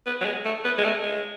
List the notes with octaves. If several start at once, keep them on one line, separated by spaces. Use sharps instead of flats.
B3
F#3
G#3
A3
B3
G#3
A3
G#3